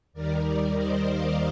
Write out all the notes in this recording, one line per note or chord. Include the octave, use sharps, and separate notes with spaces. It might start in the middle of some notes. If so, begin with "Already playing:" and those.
D#2 D#3 G3 A#4 D5
C5 D#5
D5 F5